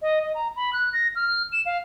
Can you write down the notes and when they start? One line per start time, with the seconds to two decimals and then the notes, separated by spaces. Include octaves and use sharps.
0.02 D#5
0.23 D#5
0.35 A#5
0.56 B5
0.73 F#6
0.93 A#6
1.16 F6
1.52 E7
1.66 F5